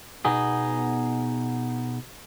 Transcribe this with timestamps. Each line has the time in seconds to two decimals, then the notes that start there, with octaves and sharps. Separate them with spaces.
0.25 B2 B3 D#4 F#4 G#4